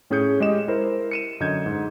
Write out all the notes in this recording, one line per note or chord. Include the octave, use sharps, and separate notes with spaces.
A2 C#4 G#4 G6 C#7
G#3 G4 D#5 E7
E4 A#4 C5
C#7 D#7 E7
F#2 D3 D#5 G6 G#6
G#2